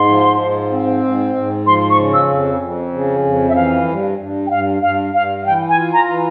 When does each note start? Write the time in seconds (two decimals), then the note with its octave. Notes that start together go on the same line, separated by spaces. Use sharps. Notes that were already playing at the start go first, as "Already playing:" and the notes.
Already playing: G#2 C6
0.08 F3
0.41 G#2
0.71 C4
1.04 G#2
1.35 G#2
1.66 F3 C6
1.90 C#6
1.98 C#3
2.14 E6
2.29 F2
2.61 F2
2.93 C#3
3.24 F2
3.49 E5
3.55 E3 F5
3.88 G2
4.19 G2
4.47 G5
4.51 G2 F5
4.82 G2 F5
5.14 G2 F5
5.42 F5
5.46 E3 G5
5.69 G#5
5.77 F4
5.93 A#5
6.09 E3